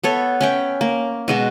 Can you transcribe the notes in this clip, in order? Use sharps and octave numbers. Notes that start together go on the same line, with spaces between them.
B3 A4 C#5 E5
C#4 E5 G5
A#3
B2 G#3 F#4